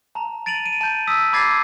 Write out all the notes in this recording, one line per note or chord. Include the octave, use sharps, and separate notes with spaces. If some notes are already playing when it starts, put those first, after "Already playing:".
A5 A#5
A6 D7 D#7 F7 F#7
D7 D#7
A5 G6
D#6 E6 B6
B5 D6 G#6 A6 C7